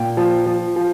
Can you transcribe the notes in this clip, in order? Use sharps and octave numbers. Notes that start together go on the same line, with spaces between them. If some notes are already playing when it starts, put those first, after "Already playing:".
Already playing: A#2 G5
F3
F3
F3